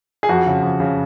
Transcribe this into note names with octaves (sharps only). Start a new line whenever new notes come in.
G#4
F2 F#4
C#3
F2
C#3